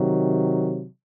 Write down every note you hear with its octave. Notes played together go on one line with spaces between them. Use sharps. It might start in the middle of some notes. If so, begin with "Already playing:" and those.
Already playing: C3 D#3 F#3